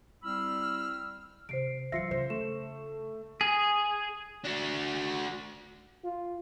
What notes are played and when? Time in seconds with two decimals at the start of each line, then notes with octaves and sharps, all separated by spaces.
0.23 G3 C4 E4 B5 E6 F6
1.49 C3 C5 C7 D7
1.92 E3 F#3 F4 E5 A#6 C7 C#7
2.11 C#3 C5
2.30 A3 E7
3.41 G#4
4.45 D4 F#4
6.04 F4